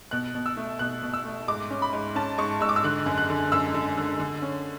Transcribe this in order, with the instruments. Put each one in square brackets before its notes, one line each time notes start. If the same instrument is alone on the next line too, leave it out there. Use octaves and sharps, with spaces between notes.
[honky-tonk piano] B2 F#6
B2
E6
A3
B2 F#6
B2
E6
A3
G#2 D6
C#4
B5
G#2
C#4 A5
G#2 C#6
G#2 E6
D6
E6
D3 F#6
F#2
F#6
D3
F#2 E6
D3
D3
D3
C#4